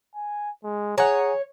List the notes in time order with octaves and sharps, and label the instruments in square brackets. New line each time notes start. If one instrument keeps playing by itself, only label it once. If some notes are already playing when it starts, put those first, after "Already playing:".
[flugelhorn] G#5
G#3
[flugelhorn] G#4 [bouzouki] C#5 [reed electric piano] F#5 G#5 A#5